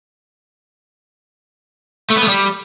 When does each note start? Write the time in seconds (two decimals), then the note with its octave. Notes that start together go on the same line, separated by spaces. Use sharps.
2.10 A3
2.16 B3
2.22 A3
2.28 G3